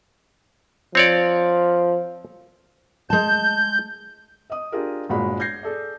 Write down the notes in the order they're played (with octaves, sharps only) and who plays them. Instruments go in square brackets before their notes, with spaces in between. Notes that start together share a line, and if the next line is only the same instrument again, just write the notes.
[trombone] F3 [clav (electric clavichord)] C4 C#5 D5
[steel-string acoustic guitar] G#3 A5 [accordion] G6
[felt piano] D#5 D#6
D4 F4 G4 G#4 A#4
G1 A#2 G#3 F#4 B5
G6 G#6 A#6 C7
G#4 A4 D5